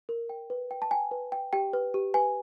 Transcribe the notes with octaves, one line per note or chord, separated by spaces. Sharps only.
A#4
G5
B4
G5
A5
G5 G#5
B4
G5
G4 G5
B4
G4
B4 G#5